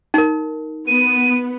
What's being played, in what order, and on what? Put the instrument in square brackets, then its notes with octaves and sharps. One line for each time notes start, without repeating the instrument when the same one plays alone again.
[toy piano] D#4 A#4
[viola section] B3 [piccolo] D#7